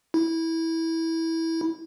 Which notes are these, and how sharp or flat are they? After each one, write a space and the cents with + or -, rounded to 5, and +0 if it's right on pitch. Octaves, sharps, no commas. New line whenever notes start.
E4 -15